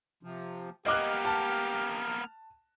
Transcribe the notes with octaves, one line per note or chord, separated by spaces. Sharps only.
C3 F3
A#3 B3 G4 D#5 D6 F6 F#6
A5